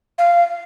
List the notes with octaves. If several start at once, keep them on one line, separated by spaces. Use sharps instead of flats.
F5